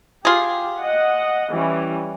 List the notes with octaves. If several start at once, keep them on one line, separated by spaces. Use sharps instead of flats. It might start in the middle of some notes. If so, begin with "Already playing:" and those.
F4 G4 G#4
D#5 F#5
E3 G3 C#4